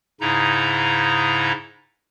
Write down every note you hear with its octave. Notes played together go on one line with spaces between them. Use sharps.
G#2 C#3 D#4 E4 A#5